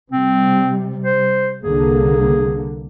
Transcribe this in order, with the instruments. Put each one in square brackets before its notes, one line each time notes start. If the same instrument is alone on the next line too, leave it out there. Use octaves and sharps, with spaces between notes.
[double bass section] C3 G3 [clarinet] C4
[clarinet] C5
[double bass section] C2 D3 A#3 [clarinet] G#4